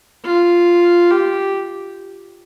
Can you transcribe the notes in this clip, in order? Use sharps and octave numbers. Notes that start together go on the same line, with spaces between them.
F4
G4